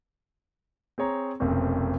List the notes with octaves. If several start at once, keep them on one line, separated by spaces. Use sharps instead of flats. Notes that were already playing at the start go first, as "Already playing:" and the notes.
C4 G#4 C#5 A#5
F1 B1 A#3 C4 C#4